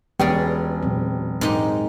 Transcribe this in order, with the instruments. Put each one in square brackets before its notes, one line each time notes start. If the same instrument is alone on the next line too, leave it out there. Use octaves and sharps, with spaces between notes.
[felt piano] E1 G5 [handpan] B3 G4 B4 [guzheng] C#4 G#4 D5
[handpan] A#2 F#3 C4
[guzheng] G#2 D#4 G4 [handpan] C4 A#4